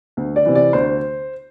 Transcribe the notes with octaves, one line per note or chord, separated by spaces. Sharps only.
D2
D5
C3 E3
D5
D2 C5